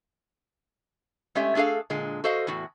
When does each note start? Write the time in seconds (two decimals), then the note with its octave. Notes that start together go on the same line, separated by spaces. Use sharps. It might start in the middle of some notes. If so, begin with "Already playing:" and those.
1.35 G#3 A3 C#4 G4 E5
1.55 A3 D4 G#4 A4 F5
1.90 A#2 D3 G#3
2.24 F#4 A4 C5 D#5 F5
2.47 E2 A2 F#4